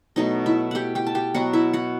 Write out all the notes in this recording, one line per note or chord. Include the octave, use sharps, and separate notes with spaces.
B2 F#3 A3 D#4 D#5
E4 E5
G4 F#5 G5
G4 G5
A5
G4 G5
B2 F#3 B3 F#4 F#5
E4 E5
F#4 F#5